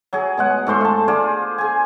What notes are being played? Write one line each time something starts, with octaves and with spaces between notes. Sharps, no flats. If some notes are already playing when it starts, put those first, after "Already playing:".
F#3 G#4
B2 G#3 F#5
G#2 A3 C5 C6
F4 A5
F4 G#4 C5 D5
G#4 G#5